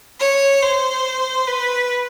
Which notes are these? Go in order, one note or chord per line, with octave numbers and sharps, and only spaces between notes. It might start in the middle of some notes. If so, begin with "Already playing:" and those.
C#5
C5
B4